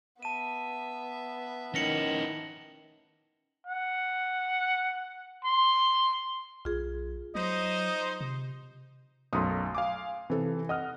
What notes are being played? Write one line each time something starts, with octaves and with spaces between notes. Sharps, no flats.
B3 E5 A5 D#7
D#3 C#4 E4 A#6 C#7 F#7
F#5
C6
B1 F4 G#4
F#3 D#4 C5 D#5
C3
B1 F#2 A3 C6 D#6
F5 G#5 D6
C3 E3 A4
D#5 F#5 D#6 F6